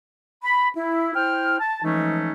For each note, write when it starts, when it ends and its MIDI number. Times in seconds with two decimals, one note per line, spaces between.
0.43 0.68 83
0.77 1.13 64
1.15 1.59 64
1.15 1.59 72
1.15 1.59 79
1.15 1.59 89
1.60 1.81 81
1.82 2.32 52
1.82 2.32 53
1.82 2.32 56
1.82 2.32 57
1.82 2.32 61
1.82 2.32 63